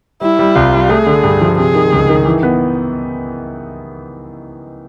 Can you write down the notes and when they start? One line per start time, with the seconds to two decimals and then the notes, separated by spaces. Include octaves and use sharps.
0.21 G3 E4
0.39 G3
0.55 C2 F4
0.73 G3
0.89 A3 G#4
1.06 D3
1.24 G2
1.41 F3
1.58 C3 G#4
1.75 D#3
1.92 C#2
2.09 D#3
2.25 E3
2.43 B3